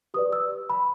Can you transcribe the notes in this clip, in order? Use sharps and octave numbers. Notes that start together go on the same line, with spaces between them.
G4 B4 D5 D#6
E6
B5